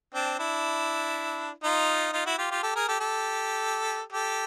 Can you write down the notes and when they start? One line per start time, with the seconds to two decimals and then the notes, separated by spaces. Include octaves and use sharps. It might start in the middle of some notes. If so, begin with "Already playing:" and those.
0.14 C4 D4
0.39 D4 E4
1.63 D#4 F4
2.13 D#4 F4
2.26 E4 F#4
2.38 F4 G4
2.51 F4 G4
2.63 G4 A4
2.76 G#4 A#4
2.88 G4 A4
3.00 G4 A4
4.12 G4 A4